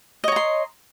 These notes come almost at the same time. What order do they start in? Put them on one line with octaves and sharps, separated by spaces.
D#5 C#5 A#5 C6